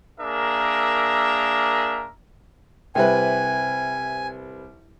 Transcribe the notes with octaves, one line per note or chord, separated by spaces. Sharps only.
A#3 D4 G#4 A#4 E5 A#5
C2 C3 B4 C5 E5 G5 G#5